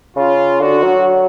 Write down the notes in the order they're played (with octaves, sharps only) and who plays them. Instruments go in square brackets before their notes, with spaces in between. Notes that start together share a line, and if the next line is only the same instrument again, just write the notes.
[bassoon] C#3 [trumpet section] F4
[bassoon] D3 [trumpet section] F#4
[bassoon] F#3